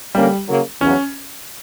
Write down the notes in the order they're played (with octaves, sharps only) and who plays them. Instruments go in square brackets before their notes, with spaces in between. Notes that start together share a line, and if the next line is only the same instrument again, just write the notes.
[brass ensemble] D3 A#3 C#4 [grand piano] G3
[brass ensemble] C#3 F#3 A#3
[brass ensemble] E2 C#3 F#3 [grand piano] C#4